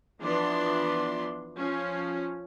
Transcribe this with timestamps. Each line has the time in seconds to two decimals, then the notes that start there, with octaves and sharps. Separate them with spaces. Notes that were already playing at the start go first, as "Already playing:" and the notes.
0.20 E3 F3 B3 D4 D5 C6
1.56 F3 C#4